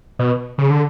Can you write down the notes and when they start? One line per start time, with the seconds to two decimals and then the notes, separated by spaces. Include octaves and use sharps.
0.19 B2
0.58 C#3
0.70 D3